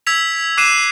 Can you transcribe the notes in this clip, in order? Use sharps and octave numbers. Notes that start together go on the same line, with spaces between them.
E6 G#6 B6 F7
D6 F#6 C7 D#7 E7